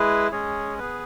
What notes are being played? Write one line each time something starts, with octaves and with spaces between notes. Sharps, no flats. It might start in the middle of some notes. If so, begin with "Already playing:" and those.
Already playing: G#3 E4 G#4 B4
G#3 C#4 G#4 C#5
B3 G#4 B4